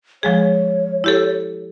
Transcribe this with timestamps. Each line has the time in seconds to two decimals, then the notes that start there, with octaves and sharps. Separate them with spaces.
0.23 F3 G#3 G#4 C#5
1.04 E4 G4 A4